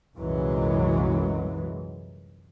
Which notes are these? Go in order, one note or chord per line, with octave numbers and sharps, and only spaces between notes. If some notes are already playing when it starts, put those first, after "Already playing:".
C2 F#2 A#2 E3 F#3 G#3